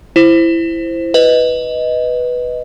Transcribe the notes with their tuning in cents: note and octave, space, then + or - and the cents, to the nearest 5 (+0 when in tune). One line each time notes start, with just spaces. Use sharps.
E4 +15 C5 +0
B4 +0 D#5 +5